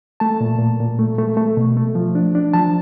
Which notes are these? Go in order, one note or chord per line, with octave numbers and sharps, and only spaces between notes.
A3 A5
A#2
A#2
A#2
A3
A3
A3
B2
A3
F3
D4
D4
F3 A5